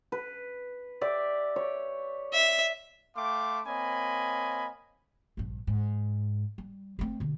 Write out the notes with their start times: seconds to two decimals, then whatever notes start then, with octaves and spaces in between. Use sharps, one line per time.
0.12 B4
1.01 G4 D5 E5
1.56 C#5
2.34 E5
3.16 A3 F5 G5 C6 D6
3.66 A#3 C4 C#5 D#5 G#5 B5
5.37 A#1 G2
5.67 G#2
6.58 G3
6.99 A3 C4
7.20 B2 D3